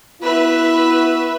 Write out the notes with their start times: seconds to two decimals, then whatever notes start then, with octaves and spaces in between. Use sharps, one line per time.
0.22 B3 E4 F#4 B4 E5